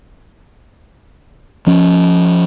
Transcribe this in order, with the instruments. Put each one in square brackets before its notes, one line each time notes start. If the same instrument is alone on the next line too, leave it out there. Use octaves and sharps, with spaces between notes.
[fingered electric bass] F3 C#4